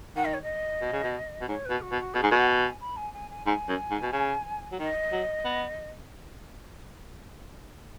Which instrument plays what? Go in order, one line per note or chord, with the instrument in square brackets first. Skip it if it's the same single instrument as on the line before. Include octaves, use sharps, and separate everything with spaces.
[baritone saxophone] D#3 [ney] F#5
[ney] D#5
C#5
D#5
[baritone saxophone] B2
C#3
B2
B2
[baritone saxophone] G#2 [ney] C#5
[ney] B4
[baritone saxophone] B2
[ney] F#4
[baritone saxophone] B2
[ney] F#4
[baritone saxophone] B2 [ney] G#4 B4
[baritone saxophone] G#2
B2
[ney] F#5
G#5
B5
G#5
G#5
G#5
[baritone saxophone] G#2 [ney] G#5
[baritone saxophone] F#2
G#2
B2
C#3
F#3
[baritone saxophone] D#3 [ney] D#5
[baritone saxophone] F#3
B3